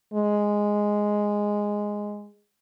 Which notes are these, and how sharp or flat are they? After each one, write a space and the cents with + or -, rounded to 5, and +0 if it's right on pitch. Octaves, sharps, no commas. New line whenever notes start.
G#3 -5